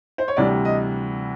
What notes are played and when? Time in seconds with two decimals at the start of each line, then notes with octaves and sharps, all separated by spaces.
0.18 C5
0.28 C#5
0.36 D2 C3 E3 G3 D5
0.65 D#5